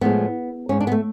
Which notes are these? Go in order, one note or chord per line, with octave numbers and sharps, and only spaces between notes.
A2 F3 G#3 B3
G#2 G#3 C#4
D4
B3
A3